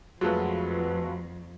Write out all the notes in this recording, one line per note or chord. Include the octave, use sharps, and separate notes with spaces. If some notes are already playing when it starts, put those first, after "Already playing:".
F2 F#3 G#3 A3 F4 F#4 B4